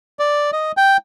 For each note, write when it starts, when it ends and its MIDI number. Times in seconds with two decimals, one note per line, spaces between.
0.19 0.51 74
0.53 0.72 75
0.77 0.97 79